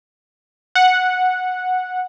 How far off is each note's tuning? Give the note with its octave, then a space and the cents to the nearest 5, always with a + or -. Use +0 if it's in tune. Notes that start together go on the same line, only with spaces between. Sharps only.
F#5 -10